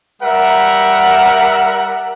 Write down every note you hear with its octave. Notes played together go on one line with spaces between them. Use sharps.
G3 A#4 E5 F#5